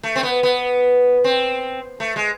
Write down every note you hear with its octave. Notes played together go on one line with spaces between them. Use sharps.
A3
C4
B3
B3
C4
A3
G#3